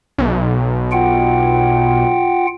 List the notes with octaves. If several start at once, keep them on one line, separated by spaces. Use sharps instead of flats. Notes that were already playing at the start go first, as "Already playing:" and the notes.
B1
F4 F#5 G5